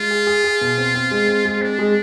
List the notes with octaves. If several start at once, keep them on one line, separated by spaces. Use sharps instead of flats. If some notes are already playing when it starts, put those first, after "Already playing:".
Already playing: G#3 F4
G#4
G#4
G#4
B2
C4
C4
G#3
C4
G#3
C4 D4
G#3